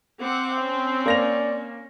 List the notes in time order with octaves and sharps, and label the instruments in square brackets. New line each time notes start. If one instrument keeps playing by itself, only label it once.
[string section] C4 [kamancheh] F#5 D6
[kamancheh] C#4
[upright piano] A#3 A#6 F7 [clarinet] D5